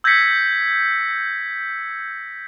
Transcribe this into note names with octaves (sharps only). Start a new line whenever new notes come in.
E6 G6 G#6 A#6 B6 C#7